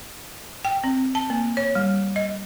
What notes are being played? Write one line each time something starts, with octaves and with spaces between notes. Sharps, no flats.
G5
C4
A5
A#3
C#5
G3
D#5